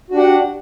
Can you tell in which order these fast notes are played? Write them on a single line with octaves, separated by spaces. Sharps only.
F#4 D4 G4 F#5